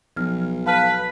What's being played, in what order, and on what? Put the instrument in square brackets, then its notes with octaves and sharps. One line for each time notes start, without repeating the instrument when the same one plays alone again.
[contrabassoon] B1 [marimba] F3 F6
[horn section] B4 [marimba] F5 A5 F6